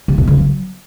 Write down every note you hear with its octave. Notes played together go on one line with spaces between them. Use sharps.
C3
B2
C#3
F#3